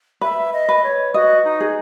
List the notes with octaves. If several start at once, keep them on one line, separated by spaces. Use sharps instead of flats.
B4 E5
D#5
B4
C#5
F#4 D#5
D#4
G#4